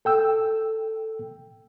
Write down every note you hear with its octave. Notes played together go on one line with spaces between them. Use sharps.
A4 G5 E6